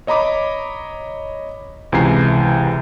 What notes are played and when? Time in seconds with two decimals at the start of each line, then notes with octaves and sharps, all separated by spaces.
0.07 C#5 D#5 A#5 B5 D6
1.92 C#2 C3 E3 G#5 A#5 C7